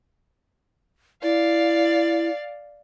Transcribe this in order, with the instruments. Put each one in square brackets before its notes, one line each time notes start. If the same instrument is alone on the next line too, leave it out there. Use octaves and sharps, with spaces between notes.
[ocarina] E4 [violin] D5 F5